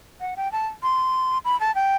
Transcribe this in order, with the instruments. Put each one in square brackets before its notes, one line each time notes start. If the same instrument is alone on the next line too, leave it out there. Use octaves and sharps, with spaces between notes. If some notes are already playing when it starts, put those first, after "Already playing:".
[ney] F#5
G5
A5
C6
B5
A5
G5